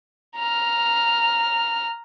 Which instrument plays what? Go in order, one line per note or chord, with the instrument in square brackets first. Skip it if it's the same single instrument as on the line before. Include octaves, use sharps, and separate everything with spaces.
[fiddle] A#5 F6